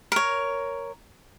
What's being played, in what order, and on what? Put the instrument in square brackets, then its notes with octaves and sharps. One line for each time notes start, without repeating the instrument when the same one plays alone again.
[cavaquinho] A#4 C#5